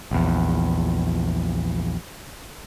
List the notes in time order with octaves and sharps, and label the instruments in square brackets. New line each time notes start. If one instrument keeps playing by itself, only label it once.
[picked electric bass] A#1 E2